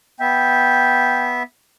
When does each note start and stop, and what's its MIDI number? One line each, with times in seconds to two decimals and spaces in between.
0.20 1.43 59
0.20 1.43 76
0.20 1.32 79